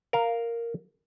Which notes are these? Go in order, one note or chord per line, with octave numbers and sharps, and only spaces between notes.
A#4 F5